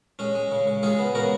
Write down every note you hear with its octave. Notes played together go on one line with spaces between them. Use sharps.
G#3 C#4
G#3
C#3
C#3
G#3 F4 G#4
B3
C#3 F#4 A#4